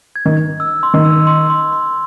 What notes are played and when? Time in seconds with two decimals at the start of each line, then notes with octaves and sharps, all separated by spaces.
0.16 G#6
0.26 D#3
0.37 G#6
0.60 E6
0.83 C6
0.94 D#3
1.05 E6
1.27 C6
1.50 C6
1.73 C6